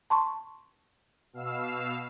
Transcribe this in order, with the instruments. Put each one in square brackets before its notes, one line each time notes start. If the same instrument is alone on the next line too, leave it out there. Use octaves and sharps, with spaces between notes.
[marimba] A5 C6 C#6
[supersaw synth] B2 F5 E6